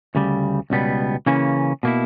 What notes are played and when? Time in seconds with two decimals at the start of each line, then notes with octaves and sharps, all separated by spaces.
0.15 D2 C#3 G3
0.70 C#2 B2 G3 B3
1.26 C#3 E3 A#3 C#4
1.83 B2 A#3 E4